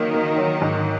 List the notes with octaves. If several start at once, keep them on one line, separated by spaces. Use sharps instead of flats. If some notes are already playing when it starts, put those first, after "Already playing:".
Already playing: D#3 F#3 A#3
A#3
F#3
G#2